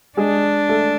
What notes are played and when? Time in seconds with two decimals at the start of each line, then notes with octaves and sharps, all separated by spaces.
0.17 G#3 D4 G#4
0.69 A3 A4